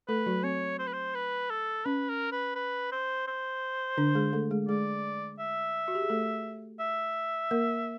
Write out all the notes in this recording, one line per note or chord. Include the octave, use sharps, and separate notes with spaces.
A3 A4 B4
F#3 F#4
C4 C#5
C5
B4
C5
B4
A4
C#4 B4
A#4
B4
B4
C5
C5
D3 D4
G#3 G#4
A3 A4
G#3 G#4
G#3 G#4 D5
E5
F#4
G4
G#4
A3 A4
E5
A#3 A#4